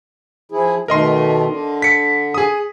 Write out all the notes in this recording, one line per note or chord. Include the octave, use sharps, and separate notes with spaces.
F3 E4 G#4
B2 D#3 A3 A#4 D#5 C6
D3
B6 C#7
G#4 D#6